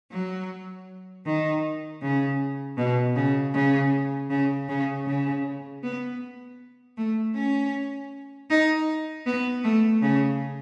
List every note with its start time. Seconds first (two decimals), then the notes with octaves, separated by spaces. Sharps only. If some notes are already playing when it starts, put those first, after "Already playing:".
0.11 F#3
1.25 D#3
2.02 C#3
2.77 B2
3.16 C#3
3.54 C#3
4.30 C#3
4.69 C#3
5.06 C#3
5.83 B3
6.97 A3
7.35 C#4
8.50 D#4
9.26 B3
9.64 A3
10.02 C#3